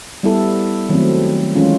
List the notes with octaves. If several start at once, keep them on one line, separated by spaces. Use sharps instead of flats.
G3 B3 E4 A4
D#3 F#3 A3 C4
E3 G#3 C#4 F4